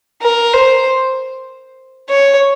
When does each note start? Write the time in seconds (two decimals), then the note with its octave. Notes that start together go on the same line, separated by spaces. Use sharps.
0.22 A#4
0.53 C5
2.09 C#5